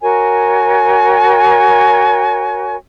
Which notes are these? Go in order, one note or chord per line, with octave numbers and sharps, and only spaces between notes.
F#4 A#4 C#5 G#5